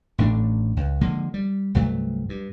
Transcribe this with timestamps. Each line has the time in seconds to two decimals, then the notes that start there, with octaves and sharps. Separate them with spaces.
0.18 A1 A2 A3 D4
0.77 C#2
1.01 D3 F3 G#3 A#3
1.34 G3
1.75 C2 G2 F#3 A3
2.29 G2